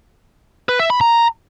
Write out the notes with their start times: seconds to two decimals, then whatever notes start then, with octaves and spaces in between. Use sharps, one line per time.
0.69 B4
0.80 E5
0.90 B5
1.01 A#5